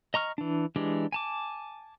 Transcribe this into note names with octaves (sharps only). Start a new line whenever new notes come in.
D#5 A#5 C#6 F6
E3 D4
E3 G#3 D4 G4
G#5 A5 D6